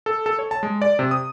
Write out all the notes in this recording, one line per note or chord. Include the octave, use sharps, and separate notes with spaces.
A4
A4
C#5
A5
G#3
D5
C3
D#6